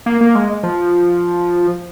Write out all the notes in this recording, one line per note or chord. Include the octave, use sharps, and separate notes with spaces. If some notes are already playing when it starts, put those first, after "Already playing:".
A#3
A#3
G#3
F3